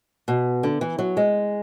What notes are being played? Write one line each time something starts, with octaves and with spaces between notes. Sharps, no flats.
B2
D3
E3
F#3
G#3